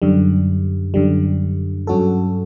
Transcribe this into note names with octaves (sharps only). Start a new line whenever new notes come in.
F#2 D3 G3
F#2 D3 G3
G2 F#3 C#4 F#4 A4